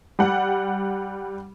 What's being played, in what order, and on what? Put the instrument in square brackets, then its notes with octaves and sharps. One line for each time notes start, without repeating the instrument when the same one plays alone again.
[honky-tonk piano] G3 F#5